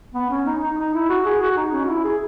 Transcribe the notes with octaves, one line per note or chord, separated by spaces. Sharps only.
B3
C#4
D#4
D#4
D#4
E4
F#4
G#4
F#4
D#4
C#4
F#4
E4
G#4